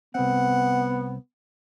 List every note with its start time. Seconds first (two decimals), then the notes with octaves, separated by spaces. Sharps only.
0.15 C2 B3 C4 F#5